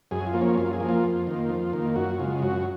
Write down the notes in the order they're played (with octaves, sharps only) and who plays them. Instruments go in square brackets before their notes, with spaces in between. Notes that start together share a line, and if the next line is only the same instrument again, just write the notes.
[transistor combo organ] F#2 G#4
F4
F3 A#3
C#4
F#2 F4
G#4
F3 A#3
F4
F2
D#3 A#3
F2
D#3 A#3
F#2 F#4
C#3 G#3 F4
F#2 F#4